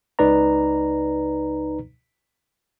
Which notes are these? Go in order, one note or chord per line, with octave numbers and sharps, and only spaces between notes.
C#2 D#4 B4 D5 A#5